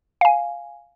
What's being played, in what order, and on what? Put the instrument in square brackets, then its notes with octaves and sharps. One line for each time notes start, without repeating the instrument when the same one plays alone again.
[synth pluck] F5 G#5